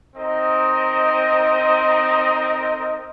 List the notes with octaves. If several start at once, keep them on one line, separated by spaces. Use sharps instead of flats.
C4 D#4 A#4 D#5